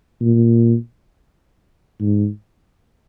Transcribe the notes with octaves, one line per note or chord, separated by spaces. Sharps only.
A#2
G#2